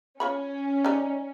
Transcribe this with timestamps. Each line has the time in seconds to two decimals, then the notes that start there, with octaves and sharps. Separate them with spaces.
0.20 C#4 F4 C#5 B5
0.85 G3 D#4